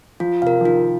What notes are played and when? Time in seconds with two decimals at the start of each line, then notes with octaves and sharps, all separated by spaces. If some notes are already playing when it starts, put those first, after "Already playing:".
0.20 F3 F4
0.42 C3 A#4 F5
0.61 F3
0.65 D#3 F4